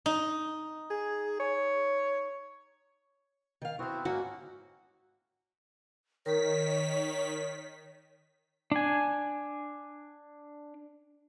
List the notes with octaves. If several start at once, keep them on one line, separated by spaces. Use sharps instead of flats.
D#4
G#4
C#5
D#3 F5
B3 C4 E4 F#4 C5
G#2 A#3 C#4 F#4
D#3 A#4 C#5 B6
D4 G#5